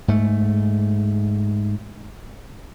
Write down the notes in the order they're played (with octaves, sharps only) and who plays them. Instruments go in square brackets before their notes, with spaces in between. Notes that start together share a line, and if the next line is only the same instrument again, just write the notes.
[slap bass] G#2 A3